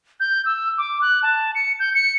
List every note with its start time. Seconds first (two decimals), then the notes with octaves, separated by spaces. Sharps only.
0.20 G6
0.45 E6
0.78 D6
1.01 F#6
1.23 A5
1.55 C#7
1.79 G6
1.95 C#7